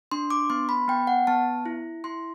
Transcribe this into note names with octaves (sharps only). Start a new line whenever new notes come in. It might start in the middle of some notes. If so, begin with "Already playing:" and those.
D4 C6
D6
B3 C6
B5
B3 G5
F#5
B3 A5
E4
E4 C6